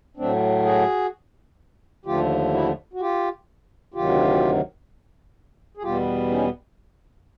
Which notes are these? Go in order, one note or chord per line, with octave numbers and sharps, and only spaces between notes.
A2 F#3 A3 C4 D4
F#4 G#4
D#2 D3 F3 A3 F4 G4
E4 F#4
F#4
F4 G4
D2 C3 D#3 F#3 F4 G4
G#4
E2 B2 G3 B3 F4 G4
C#4 D#4